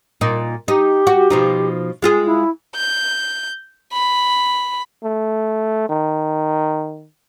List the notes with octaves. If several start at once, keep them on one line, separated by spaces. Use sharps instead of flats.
A#2 D#4
D#4 G4
F#4
B2 F3 D#4
G#3 F4 G#4
E4
G6
B5
A3
D#3